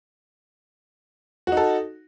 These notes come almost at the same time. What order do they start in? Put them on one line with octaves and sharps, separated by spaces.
F#4 D#4 A4